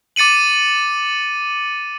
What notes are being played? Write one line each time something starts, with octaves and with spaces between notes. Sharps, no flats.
D6 A6 C#7 D#7 F#7